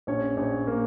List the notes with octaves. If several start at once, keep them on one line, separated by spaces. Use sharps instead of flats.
A#1 C#4 C#5
A#1
A#3